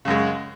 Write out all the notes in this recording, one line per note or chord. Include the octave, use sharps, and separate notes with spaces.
F#2 C#3 G#3